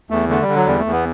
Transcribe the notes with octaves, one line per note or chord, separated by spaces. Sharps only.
E2 A3
D3 A3
G3
D3
F#3
E2 G3
A3
E2
B3